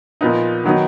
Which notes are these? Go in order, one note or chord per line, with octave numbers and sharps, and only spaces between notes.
A#2 F3 B3 D#4
D#3 F#3 B3 D#4